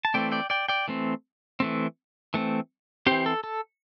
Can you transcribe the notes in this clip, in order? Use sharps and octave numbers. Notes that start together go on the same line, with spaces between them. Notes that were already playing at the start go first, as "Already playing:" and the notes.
A5
E3 A3 C4 D5 G5
D5 G5
D5 G5
D5 G5
E3 A3 C4
E3 A3 C4
E3 A3 C4
E3 C4 G4 C5
A4
A4